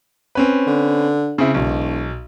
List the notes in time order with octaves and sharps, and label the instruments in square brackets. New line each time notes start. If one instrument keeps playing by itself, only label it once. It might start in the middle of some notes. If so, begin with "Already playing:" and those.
[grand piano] C4 C#4 B4
[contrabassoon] D3
[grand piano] C#3 C4 E4
[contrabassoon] E1 [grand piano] B1